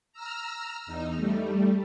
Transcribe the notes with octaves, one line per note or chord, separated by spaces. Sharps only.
A#5 E6 F6
E2 D#4
G3 A3